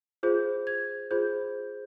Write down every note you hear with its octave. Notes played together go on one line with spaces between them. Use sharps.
F4 G#4 C5 G6
G#6
F4 G#4 C5 G6